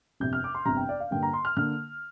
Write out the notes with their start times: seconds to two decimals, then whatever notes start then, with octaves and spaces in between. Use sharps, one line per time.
0.20 G1 F2 C3 G6
0.33 F6
0.44 D6
0.55 C6
0.65 G1 F2 C3 A#5
0.77 G5
0.89 D5
1.00 F5
1.11 G2 D3 A#3 G5
1.23 A#5
1.33 C6
1.45 F6
1.57 D3 A#3 F6